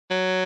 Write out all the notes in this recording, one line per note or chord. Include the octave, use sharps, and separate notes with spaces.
F#3